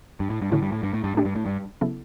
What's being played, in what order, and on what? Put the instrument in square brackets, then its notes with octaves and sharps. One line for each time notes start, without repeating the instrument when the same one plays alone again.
[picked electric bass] G2
A2
G2
[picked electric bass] A2 [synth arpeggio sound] D3 F#3 C#4 E4
[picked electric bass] G2
A2
G2
A2
G2
[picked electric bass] A2 [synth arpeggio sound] A3 D4 G4 D5
[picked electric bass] G2
A2
G2
[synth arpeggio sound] C#3 F#3 B3 E4 A4